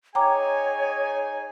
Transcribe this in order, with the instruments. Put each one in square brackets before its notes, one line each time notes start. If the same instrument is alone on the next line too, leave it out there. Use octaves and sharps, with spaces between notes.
[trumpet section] D#4 G#4 G#5 [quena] C#5 [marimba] G5 A#5 D6